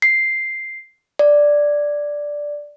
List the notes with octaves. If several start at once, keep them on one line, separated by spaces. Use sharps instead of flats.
C7
D5